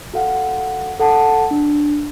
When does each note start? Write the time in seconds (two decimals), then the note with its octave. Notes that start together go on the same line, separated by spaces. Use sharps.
0.13 F#4 A4 F5 F#5
0.99 A4 F#5 A5
1.51 D4